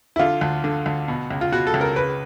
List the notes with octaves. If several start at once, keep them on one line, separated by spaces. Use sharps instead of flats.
E4
D3 F4
D2
D3
D2
B2
C#2
F4
B2 F#4
A4
C#2
A#4
C#3 B4